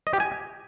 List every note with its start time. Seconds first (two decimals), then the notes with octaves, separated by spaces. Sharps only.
0.07 D#5
0.13 G4
0.20 G#5